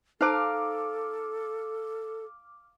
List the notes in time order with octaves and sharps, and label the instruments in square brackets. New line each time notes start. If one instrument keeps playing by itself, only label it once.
[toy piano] D#4 C5 A5 [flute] A4 [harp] F5 A#5 [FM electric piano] D6 F6